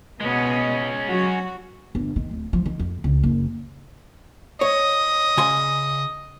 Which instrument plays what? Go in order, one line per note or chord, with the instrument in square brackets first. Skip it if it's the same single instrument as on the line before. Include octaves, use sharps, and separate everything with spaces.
[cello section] B2 B3 D#5 [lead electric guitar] G#3 C#4
[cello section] F#3 F#4
[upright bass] G1
D#3
D1
F3
D#3
F2
C#2
F#1
[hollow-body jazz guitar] C#5 [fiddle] D#5
[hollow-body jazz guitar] C#3 G#5 C6